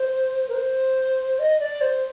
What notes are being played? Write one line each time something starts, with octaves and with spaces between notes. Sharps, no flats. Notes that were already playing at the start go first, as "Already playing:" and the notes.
Already playing: C5
A#4
C5
D#5
D5
C5